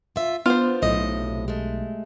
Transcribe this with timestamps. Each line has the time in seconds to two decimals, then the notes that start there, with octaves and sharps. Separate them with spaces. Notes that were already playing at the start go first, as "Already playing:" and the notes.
0.16 F4 E5
0.46 B3 D4 F4 C5
0.82 B1 A2 C3 D#5
1.48 G#3 A3